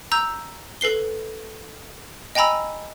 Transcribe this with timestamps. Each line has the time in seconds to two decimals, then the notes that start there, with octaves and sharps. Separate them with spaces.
0.12 A#5 E6 G6
0.81 A4 B4 C7 G7
2.35 D#5 G5 G#5 A#5 B5 E6